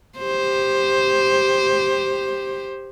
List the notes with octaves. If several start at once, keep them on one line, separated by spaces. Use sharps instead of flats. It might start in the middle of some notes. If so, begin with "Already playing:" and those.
G4 C5